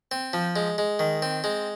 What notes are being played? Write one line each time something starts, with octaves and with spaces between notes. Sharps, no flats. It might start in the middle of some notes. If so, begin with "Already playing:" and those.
C4
F3
G#3
G#3
D#3
C4
G#3